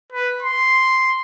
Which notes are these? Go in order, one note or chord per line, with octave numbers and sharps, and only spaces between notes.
B4
C6